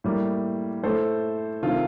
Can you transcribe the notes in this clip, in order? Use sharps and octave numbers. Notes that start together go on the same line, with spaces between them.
A2 G3 A#3
A2 A3 A4 C5
C3 D#3 A3 F4 A4